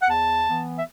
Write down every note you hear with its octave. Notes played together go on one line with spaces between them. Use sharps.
F#5
E2 A5
E3 B3
E5